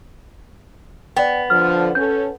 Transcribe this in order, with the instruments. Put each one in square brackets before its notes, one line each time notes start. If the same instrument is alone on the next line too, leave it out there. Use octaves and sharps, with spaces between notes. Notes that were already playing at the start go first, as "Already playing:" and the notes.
[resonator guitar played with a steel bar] B3 [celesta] D5 G5
[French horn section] D3 F3 [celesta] F6
[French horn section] C#4 A4 [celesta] G6